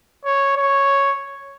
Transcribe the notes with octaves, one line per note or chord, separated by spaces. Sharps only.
C#5
C#5